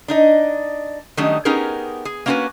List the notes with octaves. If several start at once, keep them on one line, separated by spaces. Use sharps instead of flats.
D4 D#4 D#5
D#3 F#3 G3 A3 C#4 D#4
B3 C#4 D#4 G4 G#4 A#4
G#4
A#3 B3 C#4 F4 F#4 B4